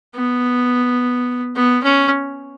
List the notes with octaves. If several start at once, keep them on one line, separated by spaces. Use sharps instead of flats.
B3
B3
C#4